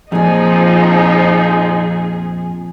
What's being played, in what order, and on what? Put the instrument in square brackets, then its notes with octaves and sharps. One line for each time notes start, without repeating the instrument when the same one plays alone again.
[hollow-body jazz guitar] F2 A#2 [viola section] F3 C4 D#4 [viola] G#4